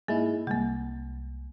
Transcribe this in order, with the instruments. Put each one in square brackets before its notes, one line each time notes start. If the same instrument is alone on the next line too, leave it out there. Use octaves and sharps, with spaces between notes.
[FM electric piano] G#2 G#3 E4 [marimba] A#3
[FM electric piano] C2 [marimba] G#3 A#3